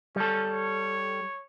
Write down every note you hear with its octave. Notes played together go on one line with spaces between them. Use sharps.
G3 C#4 A4
C#5